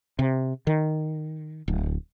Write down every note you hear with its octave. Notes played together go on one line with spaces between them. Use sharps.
C3
D#3
D1